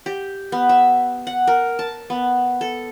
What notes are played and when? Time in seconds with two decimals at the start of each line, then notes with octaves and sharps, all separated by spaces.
0.06 G4
0.52 B3
0.69 E5
1.27 F#5
1.47 A#4
1.79 A5
2.10 B3
2.61 A4